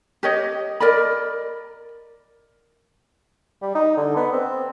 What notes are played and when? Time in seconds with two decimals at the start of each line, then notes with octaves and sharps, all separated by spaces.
0.23 G4 C#5 D#5
0.80 A#4 D5 D#5 B5
3.62 G3
3.75 D#4
3.97 D3
4.16 B3
4.32 C4